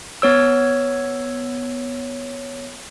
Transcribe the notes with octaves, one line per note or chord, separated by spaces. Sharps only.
B3 C#5 E6